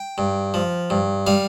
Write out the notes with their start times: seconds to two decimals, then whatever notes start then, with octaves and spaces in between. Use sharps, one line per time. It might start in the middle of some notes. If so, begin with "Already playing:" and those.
Already playing: G5
0.18 G2
0.54 F3
0.90 G2
1.27 G3 F5